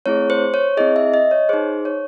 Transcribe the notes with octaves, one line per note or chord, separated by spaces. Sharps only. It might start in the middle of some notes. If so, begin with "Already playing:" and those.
A3 C4 E4 G#4 C#5
C5
C#5
C4 E4 G#4 D#5
E5
D#5
C#5
D#4 G#4 C5
C#5